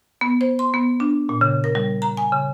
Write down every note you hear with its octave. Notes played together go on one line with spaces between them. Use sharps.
B3
C5
C6
B3
D4
A#2
C#3
A#4
G3
A#5
G#5
C#3